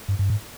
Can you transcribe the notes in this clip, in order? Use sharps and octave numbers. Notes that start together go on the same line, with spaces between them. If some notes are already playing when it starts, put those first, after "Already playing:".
G2
G2
G#2